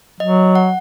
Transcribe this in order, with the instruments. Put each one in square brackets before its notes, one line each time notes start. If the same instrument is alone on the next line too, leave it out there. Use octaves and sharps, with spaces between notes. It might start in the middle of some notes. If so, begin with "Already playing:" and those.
[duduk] F#3 [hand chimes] D#5
[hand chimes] F#5